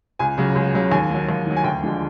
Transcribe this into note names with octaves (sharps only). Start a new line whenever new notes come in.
C#2 G#5
C#3 F#3
C#2
C#3 F#3
D#2 G#5
D#3 F#3
D#2
D#3 F#3
G#5
D2 G5
D3 F3 G#3